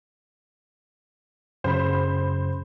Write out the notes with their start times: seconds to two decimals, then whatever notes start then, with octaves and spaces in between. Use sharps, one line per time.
1.64 F#2 C#3 C5 B5